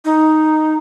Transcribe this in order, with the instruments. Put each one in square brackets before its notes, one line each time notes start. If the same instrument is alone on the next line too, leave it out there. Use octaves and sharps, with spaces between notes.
[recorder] D#4